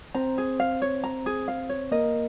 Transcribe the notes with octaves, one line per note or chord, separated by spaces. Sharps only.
C4 C5 A#5
G#4
F5
C#5
A#5
G#4
F5
C#5
A#3 A#4 D#5